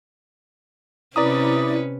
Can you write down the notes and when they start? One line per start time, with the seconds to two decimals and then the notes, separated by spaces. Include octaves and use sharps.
1.16 C3 C#4 E4 B4 D5 A#5 D#6